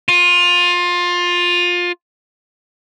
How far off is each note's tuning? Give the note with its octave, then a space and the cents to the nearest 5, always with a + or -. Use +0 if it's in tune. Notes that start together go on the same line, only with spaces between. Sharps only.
F4 +20